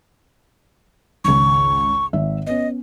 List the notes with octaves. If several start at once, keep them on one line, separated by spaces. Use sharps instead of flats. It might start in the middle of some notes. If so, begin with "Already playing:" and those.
G#1 C#2 C#6
G#1 E5
B3 C#4 D#5